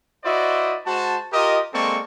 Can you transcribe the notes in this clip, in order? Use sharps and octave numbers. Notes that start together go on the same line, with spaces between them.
E4 F#4 C5 D5 D#5
G#3 F#4 C5 A5
F4 G4 A#4 D#5
G#3 A#3 C4 A4 D5 C#6